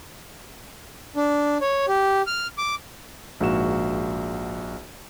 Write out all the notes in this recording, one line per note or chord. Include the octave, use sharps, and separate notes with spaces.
D4
C#5
G4
F6
D6
A#1 G#2 A#3 F#4 E7